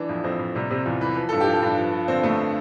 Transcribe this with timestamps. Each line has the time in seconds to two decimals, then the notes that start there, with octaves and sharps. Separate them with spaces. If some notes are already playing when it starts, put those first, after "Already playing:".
Already playing: E3 D4
0.09 F2
0.24 F2 C4
0.39 F2
0.55 C3 G3
0.70 C3 C4
0.85 E2 F4
1.01 E3 B4
1.16 F3 B4
1.29 G2 A4
1.40 G4
1.47 F3
1.53 A4
1.62 G2
1.78 F3
1.92 F3
2.08 D3 C4
2.23 F2 A3